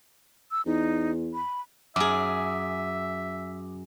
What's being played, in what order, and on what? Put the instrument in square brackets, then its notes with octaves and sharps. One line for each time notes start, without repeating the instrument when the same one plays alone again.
[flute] E6
[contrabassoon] E2 [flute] D#4
[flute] B5
[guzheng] F#2 G#4 [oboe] E5 [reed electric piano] D6